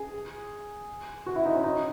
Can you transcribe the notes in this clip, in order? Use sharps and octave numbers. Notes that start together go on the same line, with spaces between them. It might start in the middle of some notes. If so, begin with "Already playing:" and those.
Already playing: G#4
F#4
E4
D#4
C#4
D#4